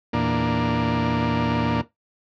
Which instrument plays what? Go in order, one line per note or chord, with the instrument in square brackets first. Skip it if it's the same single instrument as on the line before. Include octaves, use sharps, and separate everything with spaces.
[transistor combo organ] E2 A#2 A#3 D4